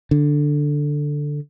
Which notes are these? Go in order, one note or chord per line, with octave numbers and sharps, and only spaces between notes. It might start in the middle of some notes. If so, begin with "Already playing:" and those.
D3